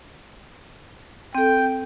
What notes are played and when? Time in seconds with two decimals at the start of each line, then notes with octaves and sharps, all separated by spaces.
1.35 C4 A4 G5